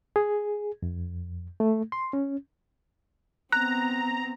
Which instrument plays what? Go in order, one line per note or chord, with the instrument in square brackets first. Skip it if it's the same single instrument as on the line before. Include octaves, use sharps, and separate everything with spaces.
[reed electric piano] G#4
F2
A3
C6
C#4
[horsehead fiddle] B3 C4 [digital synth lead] A#5 [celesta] F#6